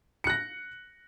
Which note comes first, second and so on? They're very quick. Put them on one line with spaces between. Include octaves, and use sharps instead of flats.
C#7 F#6 A#6